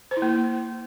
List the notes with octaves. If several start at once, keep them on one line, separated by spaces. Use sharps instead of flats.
C5
E4
A#3